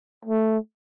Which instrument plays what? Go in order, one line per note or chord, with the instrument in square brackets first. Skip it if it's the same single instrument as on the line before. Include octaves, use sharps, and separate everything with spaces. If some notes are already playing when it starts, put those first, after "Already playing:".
[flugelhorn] A3